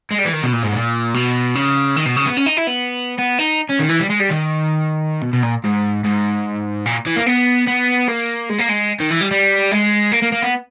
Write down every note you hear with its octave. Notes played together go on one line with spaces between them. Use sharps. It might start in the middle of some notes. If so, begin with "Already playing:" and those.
G#3
G3
E3
D#3
B2
A#2
G#2
A#2
B2
C#3
D#3
B2
C#3
B3
C#4
D#4
E4
B3
B3
D#4
C#4
D#3
E3
G3
G#3
G3
D#3
B2
B2
A#2
G#2
G#2
A#2
E3
A#3
B3
B3
A#3
G#3
A#3
G#3
D#3
E3
G3
G3
G#3
A#3
A#3
A#3
B3